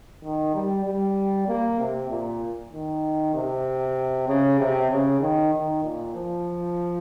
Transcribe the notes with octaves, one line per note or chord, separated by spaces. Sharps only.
D#3
G3
G3
A#3
C3
A#2
D#3
C3
C#3
C3
C#3
D#3
D#3
A#2
F3